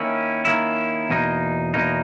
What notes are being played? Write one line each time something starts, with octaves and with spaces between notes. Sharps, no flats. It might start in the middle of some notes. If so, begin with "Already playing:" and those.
Already playing: D#3 A#3 C#4 E4
D#3 A#3 C#4 E4
E2 B2 A#3 D#4
E2 B2 A#3 D#4